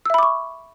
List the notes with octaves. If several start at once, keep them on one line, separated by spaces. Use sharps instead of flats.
E5 B5 C#6 D6 E6